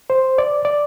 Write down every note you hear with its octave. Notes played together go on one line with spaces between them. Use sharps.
C5
D5
D5